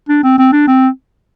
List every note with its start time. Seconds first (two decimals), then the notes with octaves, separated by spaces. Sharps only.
0.09 D4
0.23 C4
0.38 C4
0.53 D4
0.67 C4